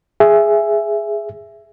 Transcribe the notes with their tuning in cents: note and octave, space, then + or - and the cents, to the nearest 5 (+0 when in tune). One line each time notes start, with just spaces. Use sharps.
G#4 +0 E5 +10